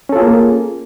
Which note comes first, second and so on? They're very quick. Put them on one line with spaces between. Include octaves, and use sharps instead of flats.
C#4 A4 F4 G#4 A#3